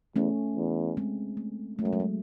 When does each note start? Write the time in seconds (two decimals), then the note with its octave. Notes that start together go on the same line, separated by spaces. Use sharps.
0.16 E2 A3 C#4
0.57 E2
0.97 G#3 C4
1.37 A3
1.78 F#2 A3
1.85 G#3
1.93 F#3
2.00 G#3